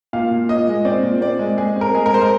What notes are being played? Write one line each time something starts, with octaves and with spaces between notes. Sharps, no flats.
A#2 F5
A#2
A#2 D#5
G#3
C4 D5
A#2
C4 D5
G#3
G#3 G#4
C4
A#4
G#3 G#4
A#4
G#3 C5
A#4